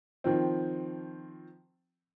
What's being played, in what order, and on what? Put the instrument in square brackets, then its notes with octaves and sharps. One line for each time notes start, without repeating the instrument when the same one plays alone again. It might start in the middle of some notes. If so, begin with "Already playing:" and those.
[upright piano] D#3 F3 C4